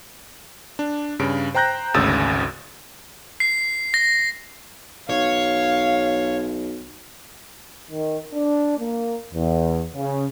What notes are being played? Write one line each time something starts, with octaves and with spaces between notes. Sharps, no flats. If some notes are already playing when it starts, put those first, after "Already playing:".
D4
G2 C#3 D7
C5 G5 A#5 F#6 G6 A#6
G#1 D2 C#3 D#6 E6 A6
C7
A#6
B1 C#5 F5
D#3
D4
A#3
E2
C#3